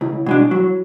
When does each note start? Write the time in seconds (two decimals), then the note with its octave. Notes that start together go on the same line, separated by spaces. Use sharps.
0.01 C#2 E4
0.26 B2 G#3 D4
0.51 F#3 F#4